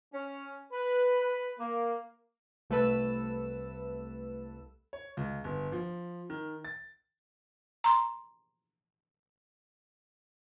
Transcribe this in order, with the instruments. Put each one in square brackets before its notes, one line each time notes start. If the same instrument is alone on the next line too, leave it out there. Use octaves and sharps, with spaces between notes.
[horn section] C#4
B4
A#3
[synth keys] C2 A3 A4 B4 A5 E6
[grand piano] C#5
C#2
G1
F3
D#3
A6
[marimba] A#5 C6